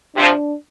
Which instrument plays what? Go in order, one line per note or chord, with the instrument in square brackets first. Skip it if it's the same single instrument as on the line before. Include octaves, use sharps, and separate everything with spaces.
[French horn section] C3 F3 [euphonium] D4